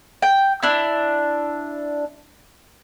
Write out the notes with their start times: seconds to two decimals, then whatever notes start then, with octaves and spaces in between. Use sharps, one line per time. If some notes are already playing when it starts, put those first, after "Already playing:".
0.22 G5
0.63 D4 E4